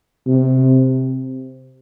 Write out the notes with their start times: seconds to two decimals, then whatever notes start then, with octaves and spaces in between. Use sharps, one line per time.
0.27 C3